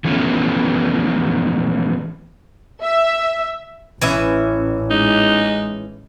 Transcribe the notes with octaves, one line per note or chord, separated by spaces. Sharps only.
E3 F3 A3 B3 C#4 F4
E5
A1 E3 C#4 E5
G#3 D#4